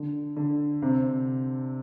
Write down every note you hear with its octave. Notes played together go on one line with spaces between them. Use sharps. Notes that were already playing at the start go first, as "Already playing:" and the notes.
Already playing: D3
D3
C3